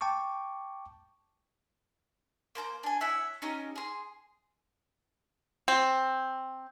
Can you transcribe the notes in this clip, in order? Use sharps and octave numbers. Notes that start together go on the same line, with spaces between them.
G5 A5 C#6 D6
A#3 C5 A#5 G6
D4 G#5
E4 C#5 E5 F#5
C#4 D#4 G4
G#4 C6
C4